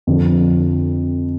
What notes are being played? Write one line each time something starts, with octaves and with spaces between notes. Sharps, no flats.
F2 D3 F3